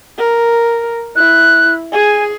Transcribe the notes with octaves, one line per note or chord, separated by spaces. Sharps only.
A#4
E4 F#6
G#4 G#5